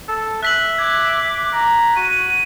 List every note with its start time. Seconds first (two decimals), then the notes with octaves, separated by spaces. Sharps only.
0.08 A4
0.43 E5 F#6 B6 F#7
0.78 D6 G#6
1.53 A#5
1.96 F#4 D#7